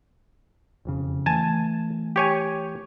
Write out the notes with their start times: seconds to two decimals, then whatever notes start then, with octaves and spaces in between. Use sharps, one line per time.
0.85 E1 F2 C#3
1.26 E3 A3 G#5 A5
2.16 G4 C#5 G#5